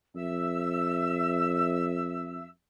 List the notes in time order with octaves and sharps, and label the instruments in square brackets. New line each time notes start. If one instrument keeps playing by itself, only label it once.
[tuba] F2 [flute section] E5 E6